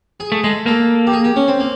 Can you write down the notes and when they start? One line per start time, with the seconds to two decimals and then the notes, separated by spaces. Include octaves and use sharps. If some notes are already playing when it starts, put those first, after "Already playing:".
0.20 G#4
0.32 A3
0.44 G#3 A4
0.66 A#3 A4
1.07 G4
1.13 G#4
1.24 G4
1.36 C#4
1.48 C4
1.60 A#3